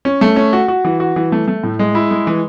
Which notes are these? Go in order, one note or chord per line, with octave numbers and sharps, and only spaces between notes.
C#4
A3
C#4
F#4
F#4
E3
F#4
E3
A3
A3
A2
G#3
E4
G#3
E3